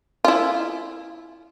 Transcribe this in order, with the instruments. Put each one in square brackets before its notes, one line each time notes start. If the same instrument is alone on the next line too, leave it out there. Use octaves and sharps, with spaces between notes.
[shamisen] E4 F4